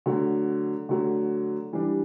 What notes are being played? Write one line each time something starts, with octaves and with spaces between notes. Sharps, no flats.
D3 F#3 A3
D3 F#3 A3
E3 G3 D4 G4